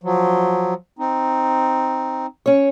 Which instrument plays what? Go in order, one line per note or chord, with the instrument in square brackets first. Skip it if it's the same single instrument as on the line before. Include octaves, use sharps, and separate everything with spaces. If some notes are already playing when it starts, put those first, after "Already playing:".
[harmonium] F3 F#3
C4 D#4
[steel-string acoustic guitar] C#4 C#5